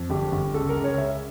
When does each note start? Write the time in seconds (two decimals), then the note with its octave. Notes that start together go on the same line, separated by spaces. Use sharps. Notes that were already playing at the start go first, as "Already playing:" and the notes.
Already playing: F2
0.10 G1 G4
0.32 G1
0.54 C#2 A4
0.69 A#4
0.77 C#2
0.84 C#5
0.98 C#3 E5